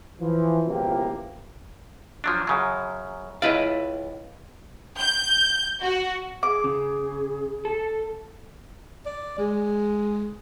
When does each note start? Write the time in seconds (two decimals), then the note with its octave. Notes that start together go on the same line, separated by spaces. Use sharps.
0.20 E3 F3
0.67 C#2 B2 F3 A#3 E4 G4
2.24 F3 F#3 D4
2.47 F#2 C#3 F#3
3.42 C#2 E4 B4 D5 D#5 F5
4.98 G6
5.82 F#4
6.43 G#4 D6
6.64 C#3
7.65 A4
9.06 D5
9.38 G#3